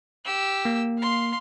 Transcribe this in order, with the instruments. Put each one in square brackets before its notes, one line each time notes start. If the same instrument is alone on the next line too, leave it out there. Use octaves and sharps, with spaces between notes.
[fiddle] G4 E6
[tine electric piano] A#3
[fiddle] F5 C6